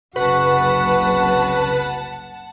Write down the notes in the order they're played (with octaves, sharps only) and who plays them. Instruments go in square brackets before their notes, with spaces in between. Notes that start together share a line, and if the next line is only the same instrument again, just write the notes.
[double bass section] F#1 C2 C#3 [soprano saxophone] F#4 [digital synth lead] B4 [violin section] F#5 A5